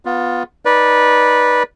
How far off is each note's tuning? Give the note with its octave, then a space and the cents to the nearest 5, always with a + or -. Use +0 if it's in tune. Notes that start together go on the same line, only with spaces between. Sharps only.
B3 +0 F4 +15
D#4 +0 B4 -15 D5 +0